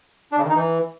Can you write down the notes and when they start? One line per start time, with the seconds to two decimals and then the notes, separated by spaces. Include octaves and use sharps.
0.32 D4
0.38 C#3
0.44 D#3
0.50 D#4
0.56 E3